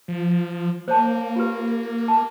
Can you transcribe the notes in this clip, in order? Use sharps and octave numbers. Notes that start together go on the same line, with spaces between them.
F3
A#3 C5 C#5 A5
F4 G4 B4
A5